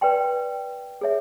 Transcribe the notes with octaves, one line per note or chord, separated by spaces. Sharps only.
B4 D5 G5 C6
G#4 C#5 E5